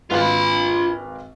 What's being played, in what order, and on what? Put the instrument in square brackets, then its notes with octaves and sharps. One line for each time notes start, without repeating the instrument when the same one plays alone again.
[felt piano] G#1 B4 F5 [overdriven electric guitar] F4 B5